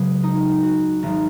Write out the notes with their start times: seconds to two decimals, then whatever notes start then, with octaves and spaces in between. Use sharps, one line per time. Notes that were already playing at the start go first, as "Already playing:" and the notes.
Already playing: C#2 C#3 F#3 G#4 B4
0.23 D#4
0.63 F#4
1.03 G#1 F#3 D#4